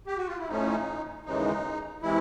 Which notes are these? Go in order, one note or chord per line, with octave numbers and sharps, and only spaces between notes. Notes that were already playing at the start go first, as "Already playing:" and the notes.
G4
F#4
F4
E4
A2 F3 A3 C#4 D#4
D#2 C#3 E3 G#3 D#4
C3 E3 G#3 E4